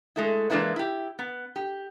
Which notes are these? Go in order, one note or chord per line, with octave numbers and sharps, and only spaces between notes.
G#3 A3 E4
E3 G#3 A#3 D4 E4 B4
E4 G4
B3
G4